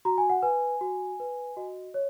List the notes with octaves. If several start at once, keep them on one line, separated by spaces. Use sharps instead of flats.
F#4 A#5
G#5
F#5
B4 G#5
F#4
B4
F#4 D#5
C#5